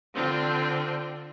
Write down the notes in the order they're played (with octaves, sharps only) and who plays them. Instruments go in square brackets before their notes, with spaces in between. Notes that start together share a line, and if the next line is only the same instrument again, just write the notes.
[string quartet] D3 C4 D4 F4